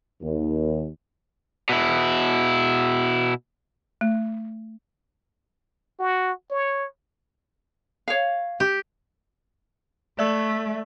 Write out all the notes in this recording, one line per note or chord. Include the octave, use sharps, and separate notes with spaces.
D#2
B2 E4
A3
F#4
C#5
C#5 F5
G4
A3 D5 E5 E6